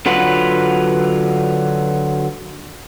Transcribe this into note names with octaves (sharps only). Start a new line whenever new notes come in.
D3 F#3 F4 B4 F#5